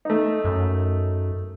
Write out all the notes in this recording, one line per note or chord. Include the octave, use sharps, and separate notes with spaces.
A3 D#4
F#2